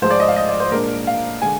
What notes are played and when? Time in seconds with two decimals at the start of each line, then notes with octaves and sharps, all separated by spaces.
0.02 G#2 F3 G#3 C5
0.10 D5
0.20 D#5
0.28 F5
0.36 D#5
0.49 D5
0.60 C5
0.71 A#2 G#3 D4 A#4
1.07 F5
1.42 D3 G#3 G#5